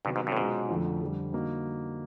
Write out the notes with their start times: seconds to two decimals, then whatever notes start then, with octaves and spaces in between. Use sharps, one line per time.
0.05 G2 C3 D#3 F#3 B3
0.16 G#2
0.27 G2
0.32 A2
0.36 G#2 B2 G#3 C#4 F4
0.69 F2 D3 F3 A3
1.01 F2 D3 G3
1.33 D3 G3 A#3 D#4 F#4